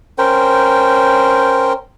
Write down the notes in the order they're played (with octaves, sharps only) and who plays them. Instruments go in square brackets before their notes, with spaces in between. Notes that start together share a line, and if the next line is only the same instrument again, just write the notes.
[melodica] C#4 A#4 C5 G5